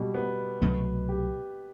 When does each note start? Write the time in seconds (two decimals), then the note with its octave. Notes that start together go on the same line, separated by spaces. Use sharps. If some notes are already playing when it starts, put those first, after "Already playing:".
Already playing: B2 G3
0.14 B3
0.62 C2 B2 F#3 A3
1.09 G4